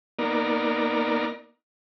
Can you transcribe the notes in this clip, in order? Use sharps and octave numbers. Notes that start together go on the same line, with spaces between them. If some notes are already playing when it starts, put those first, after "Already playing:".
A#3 B3 D#4 A#4 D5